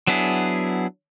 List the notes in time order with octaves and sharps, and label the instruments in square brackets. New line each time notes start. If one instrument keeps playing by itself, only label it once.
[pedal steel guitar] F#3 B3 D4 E4 G#4